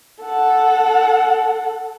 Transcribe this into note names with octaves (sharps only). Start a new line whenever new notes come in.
A4 F#5